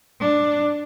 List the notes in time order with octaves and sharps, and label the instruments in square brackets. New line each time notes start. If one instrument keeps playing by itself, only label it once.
[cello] D4